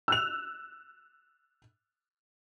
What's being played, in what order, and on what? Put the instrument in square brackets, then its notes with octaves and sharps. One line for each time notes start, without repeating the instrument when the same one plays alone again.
[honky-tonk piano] E6 F#6 F7